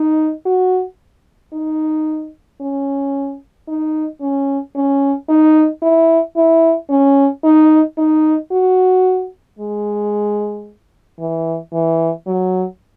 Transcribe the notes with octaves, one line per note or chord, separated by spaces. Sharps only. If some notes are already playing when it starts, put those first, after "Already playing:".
Already playing: D#4
F#4
D#4
C#4
D#4
C#4
C#4
D#4
E4
E4
C#4
D#4
D#4
F#4
G#3
E3
E3
F#3